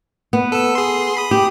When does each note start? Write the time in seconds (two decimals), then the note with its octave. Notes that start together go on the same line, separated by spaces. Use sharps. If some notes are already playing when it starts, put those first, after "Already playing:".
0.33 B3
0.52 A4 E6
0.75 G#4 C6
1.17 B5 D#6
1.31 G4